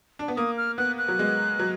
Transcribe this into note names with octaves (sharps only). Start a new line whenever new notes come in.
D4
B3
A#3 D#6
F6
B3 F#6
F#6
F#3
G#3
F#3